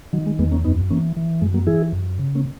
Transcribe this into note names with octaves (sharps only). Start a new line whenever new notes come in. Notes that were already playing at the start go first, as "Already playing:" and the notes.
D#3 F#3
G#3
E2 G#3 B3
A#3 C#4
F#2 B3 D#4
E3 A#3 C#4
E3
F#2 G#3
F#3 A#3
E3 E4 G#4
F#2
C#3
A#3 C#4